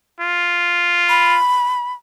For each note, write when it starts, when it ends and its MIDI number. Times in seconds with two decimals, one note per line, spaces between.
0.21 1.39 65
1.09 1.92 83